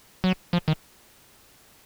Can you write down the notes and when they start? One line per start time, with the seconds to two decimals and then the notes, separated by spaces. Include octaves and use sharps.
0.24 F#3
0.53 F3
0.68 D#3